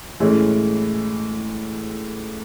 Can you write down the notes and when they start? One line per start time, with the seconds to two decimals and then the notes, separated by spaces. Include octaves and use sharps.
0.20 A2 E3 G#3 C#4